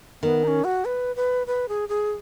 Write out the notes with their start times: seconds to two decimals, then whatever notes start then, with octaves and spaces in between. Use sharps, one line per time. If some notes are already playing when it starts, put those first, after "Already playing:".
0.22 D#3 B3
0.44 D#4
0.47 C#4
0.64 F#4
0.85 B4
1.16 B4
1.47 B4
1.69 G#4
1.89 G#4